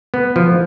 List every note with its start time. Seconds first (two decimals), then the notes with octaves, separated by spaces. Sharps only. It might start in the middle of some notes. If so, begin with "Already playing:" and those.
0.14 B3
0.36 F3